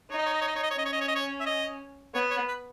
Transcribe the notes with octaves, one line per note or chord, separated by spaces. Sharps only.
D#4 C#5
D#5
C#5
D#5
C#5
D#5
C#5
D#5
C#5
C#4 D#5
C#5
D#5
C#5
D#5
C#5
E5
D#5
B3 C#5
C#5
B4